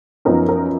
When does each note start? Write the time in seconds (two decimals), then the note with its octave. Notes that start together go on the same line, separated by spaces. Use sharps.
0.25 F#2 F3 B3 D#4 A#4
0.49 A#4